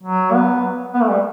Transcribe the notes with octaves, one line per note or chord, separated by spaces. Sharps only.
F#3
B3
B3
A3
G3